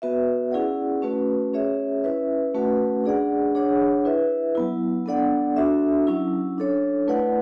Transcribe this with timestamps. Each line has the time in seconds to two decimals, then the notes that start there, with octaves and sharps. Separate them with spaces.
0.02 B3 F#4 B4 E5
0.52 C#4 E4 G#4 D5 F#5
1.02 A3 C#4 F#4 B4
1.53 C#4 G#4 C#5 E5
2.04 C#4 E4 B4 E5
2.54 A3 C#4 F#4 B4 F#5
3.04 D4 G#4 D5 F#5
3.55 D4 G#4 C#5 F#5
4.05 E4 B4 E5
4.55 F#3 B3 E4
5.06 B3 D4 A4 D5 F#5
5.56 D4 F#4 A4 E5
6.07 F#3 C#4 E4
6.58 D4 A4 C#5
7.07 A3 E4 B4 D5 F#5